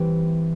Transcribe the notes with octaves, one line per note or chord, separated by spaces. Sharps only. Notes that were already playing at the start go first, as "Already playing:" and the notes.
Already playing: E3 G3 C4